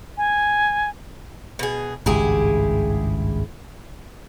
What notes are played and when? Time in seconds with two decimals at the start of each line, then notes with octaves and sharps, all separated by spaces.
0.18 G#5
1.59 B2 G#4
2.06 G#1 C#2 G2 E4 G4 G#4